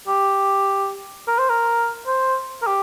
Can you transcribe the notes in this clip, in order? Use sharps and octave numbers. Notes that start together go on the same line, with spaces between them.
G4
A#4
C5
A#4
C5
A#4
G4